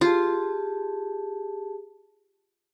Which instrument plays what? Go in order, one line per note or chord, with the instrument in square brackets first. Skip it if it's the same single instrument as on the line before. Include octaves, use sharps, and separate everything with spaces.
[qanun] F4 [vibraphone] G4 G#4 A5